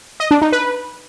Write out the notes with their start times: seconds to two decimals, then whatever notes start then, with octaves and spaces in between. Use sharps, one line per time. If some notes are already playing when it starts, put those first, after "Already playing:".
0.20 D#5
0.31 D4
0.42 D#4
0.52 B4